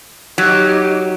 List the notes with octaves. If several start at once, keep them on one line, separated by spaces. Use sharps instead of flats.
F#3 D#4 G4